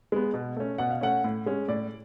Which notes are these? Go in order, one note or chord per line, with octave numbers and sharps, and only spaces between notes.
G#3 B3
B2
A3 C#4
B2 F#5
F5
A3 C#4 F#5
A2
G#3 C#4
A2 D5